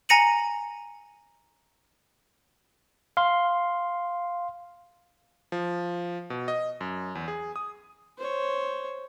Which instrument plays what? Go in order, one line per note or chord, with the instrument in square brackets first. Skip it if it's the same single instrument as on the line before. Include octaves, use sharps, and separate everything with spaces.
[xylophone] G#5 A#5 A#6 C#7 D#7 F#7
[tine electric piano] F5 C6
[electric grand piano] F3
B2
D#5
F#2
E2
G#4
D#6
[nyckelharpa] C5 C#5